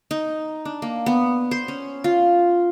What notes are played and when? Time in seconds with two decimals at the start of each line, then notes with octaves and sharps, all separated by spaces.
0.11 D#4
0.65 D4
0.82 A#3
1.06 B3
1.51 C5
1.68 C#4
2.04 F4